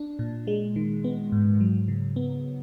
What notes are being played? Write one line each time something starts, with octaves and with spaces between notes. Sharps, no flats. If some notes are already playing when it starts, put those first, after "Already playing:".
Already playing: D4
A#2
G#3
D#3
B3
G#2
F#3
C#3
B3